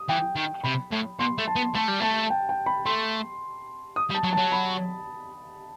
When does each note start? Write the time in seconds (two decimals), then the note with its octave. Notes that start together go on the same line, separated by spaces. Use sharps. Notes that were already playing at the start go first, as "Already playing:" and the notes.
Already playing: D#6
0.09 E3 G5
0.36 D#3
0.63 C3 B5
0.92 A2
1.19 B2 C6
1.38 A3
1.48 A5
1.56 B3
1.75 A3 A5
1.88 G3
2.00 A3 A5
2.30 G5
2.49 G5
2.66 B5
2.86 A3 C6
3.96 D#6
4.11 G3
4.15 A5
4.24 F#3
4.33 A5
4.37 F#3
4.52 B5